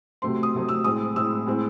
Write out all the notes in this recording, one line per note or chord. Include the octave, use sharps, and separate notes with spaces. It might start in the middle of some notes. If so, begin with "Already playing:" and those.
C3 F#3 A3 C4 C6
D#6
C3 F#3 A3 C4
E6
A2 G#3 C4 D#6
A2 G#3 C4 E6
A2 G#3 C4